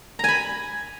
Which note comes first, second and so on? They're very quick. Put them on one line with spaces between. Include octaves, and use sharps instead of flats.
A#5 G#5 B5